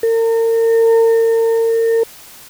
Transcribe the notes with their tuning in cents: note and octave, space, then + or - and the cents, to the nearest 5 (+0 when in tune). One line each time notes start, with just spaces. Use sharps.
A#4 -40